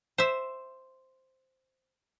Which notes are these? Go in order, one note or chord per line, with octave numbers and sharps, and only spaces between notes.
C5 E5